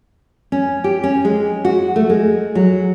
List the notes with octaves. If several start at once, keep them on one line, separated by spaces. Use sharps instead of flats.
C#4
G4
C#4
G#3
F#4
A3
G#3
F#3